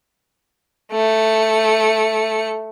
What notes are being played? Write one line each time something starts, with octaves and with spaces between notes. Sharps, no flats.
A3 C#7